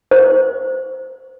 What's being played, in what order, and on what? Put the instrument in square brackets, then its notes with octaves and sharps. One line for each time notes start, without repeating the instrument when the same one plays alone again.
[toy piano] C5